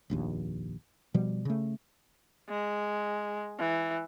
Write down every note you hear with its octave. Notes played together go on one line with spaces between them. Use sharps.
F1 A#1 D#2
B2 F3 G3
C#3 A3
G#3
E3